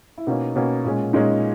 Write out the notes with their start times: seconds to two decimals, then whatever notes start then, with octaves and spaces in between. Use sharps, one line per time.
0.18 E4
0.27 B2 A#3 C#4 D#4
0.56 B2 A#3 C#4
0.85 A#2 G#3 C#4
1.13 A#2 G#3 C#4 D#4